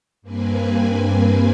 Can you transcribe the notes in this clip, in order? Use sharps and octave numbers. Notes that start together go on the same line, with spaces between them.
G2 A#3 C4 B4 G#5